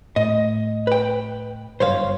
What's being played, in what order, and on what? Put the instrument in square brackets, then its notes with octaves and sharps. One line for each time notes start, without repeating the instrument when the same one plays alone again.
[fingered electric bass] A2 [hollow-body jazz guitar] D#5
[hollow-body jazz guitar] B4 G5
[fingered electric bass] F#1 G2 [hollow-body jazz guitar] C5 C#5 F5